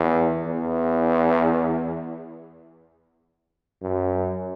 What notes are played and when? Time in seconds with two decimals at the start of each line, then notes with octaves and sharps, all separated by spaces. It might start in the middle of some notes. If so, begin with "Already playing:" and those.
Already playing: E2
0.46 E2
3.82 F#2